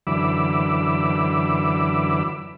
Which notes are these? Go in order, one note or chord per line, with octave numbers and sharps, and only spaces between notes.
F#2 D3 E3 B5 D6 E6